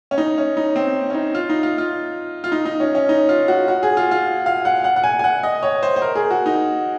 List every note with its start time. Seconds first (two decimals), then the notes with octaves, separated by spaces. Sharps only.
0.11 C#4
0.18 D#4
0.38 C#4
0.57 D#4
0.76 C4
1.10 C#4
1.14 D#4
1.35 F4
1.50 D#4
1.63 F4
1.78 F4
2.44 F4
2.52 D#4
2.65 D#4
2.80 C#4
2.95 C#4
3.09 D#4
3.29 F4
3.48 F#4
3.68 F#4
3.83 G#4
3.97 F4
4.11 F4
4.46 F5
4.65 F#5
4.84 F#5
4.96 F#5
5.04 G#5
5.19 G#5
5.24 F#5
5.43 D#5
5.63 C#5
5.83 C5
5.96 C5
6.02 A#4
6.15 G#4
6.31 F#4
6.46 D#4